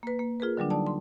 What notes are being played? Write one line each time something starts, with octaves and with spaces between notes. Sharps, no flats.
A#3 B4
A#3
F4 G#4 A#4 B4
D3 F#3 G3 D4
D#4 D5 A5
C6